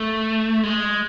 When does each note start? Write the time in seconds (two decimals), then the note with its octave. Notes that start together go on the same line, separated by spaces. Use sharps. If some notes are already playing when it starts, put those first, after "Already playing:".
Already playing: A3
0.63 G#3